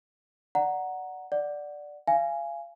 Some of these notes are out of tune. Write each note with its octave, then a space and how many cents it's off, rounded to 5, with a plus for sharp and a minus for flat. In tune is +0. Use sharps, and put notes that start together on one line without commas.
D5 +0 F#5 +0 A#5 +0
D5 +0 F#5 +0
F5 -35 G#5 +0